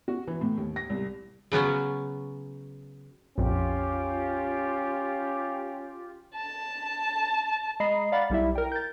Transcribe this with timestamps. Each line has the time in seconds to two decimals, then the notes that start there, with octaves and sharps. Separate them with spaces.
0.08 F#4
0.27 E3
0.41 A2
0.57 D#2
0.76 A#6
0.90 C2
1.52 C#3 F#3 B3 C#4
3.38 A#1 F2 C#4 F4 G4
6.35 A5
7.80 G#3 D#5 A#5 B5 C7
8.12 D5 F5 F#5 B5 A6
8.30 B1 G3 E4 E5
8.55 A#4 G5
8.72 G6 A6